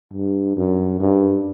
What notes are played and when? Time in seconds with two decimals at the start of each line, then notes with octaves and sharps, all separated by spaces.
0.14 G2
0.57 F#2
1.00 G2